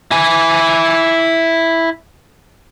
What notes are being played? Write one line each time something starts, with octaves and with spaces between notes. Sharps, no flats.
E4 G#5